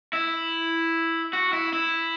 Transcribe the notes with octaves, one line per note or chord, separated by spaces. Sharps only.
E4
F#4
E4
E4